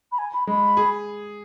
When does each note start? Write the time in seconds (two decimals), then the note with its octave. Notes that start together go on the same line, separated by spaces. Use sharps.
0.11 B5
0.18 G#5
0.33 B5
0.47 G#3 B5
0.77 G#4